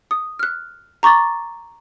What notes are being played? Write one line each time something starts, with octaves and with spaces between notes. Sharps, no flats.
D#6
F6 F#6
A#5 C#6 D6 A6